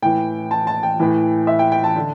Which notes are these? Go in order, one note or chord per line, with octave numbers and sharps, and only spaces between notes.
A2 E3 G5
A5
A5
G5
A2 E3
E5
G5
G5
A5
D3